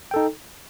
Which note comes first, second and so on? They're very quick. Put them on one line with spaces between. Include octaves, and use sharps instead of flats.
G5 A4 D#4